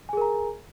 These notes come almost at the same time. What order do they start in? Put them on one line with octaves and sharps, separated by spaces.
G#5 G#4 A#4 A#5